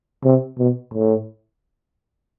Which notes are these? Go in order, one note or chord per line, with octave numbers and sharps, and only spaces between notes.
C3
B2
A2